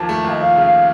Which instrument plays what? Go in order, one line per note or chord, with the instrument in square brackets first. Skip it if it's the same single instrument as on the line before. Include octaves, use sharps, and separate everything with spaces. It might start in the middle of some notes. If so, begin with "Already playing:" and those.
Already playing: [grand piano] D#2 F3 [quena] A5
[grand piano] A3
[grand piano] D#2 [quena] D#5
[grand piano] F3 [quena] F5
[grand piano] C#3
[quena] F5